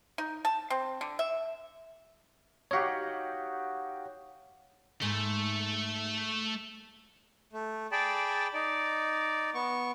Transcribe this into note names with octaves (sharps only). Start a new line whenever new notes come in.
D#4
A5
C4
D3
E5
D#4 F#4 G4 C#5 F5
G#2 A3
A3
G#4 D5 G5 A5 B5
D#4 D5
B3 C#6